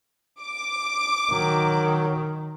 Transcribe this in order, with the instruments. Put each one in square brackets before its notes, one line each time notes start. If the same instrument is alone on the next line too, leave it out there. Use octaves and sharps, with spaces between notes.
[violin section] D6
[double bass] D#3 [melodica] F#3